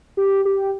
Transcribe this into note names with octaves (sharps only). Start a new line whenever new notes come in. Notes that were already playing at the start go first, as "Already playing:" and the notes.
G4
G4